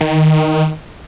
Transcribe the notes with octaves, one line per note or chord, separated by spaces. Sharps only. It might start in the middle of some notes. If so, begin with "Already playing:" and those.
D#3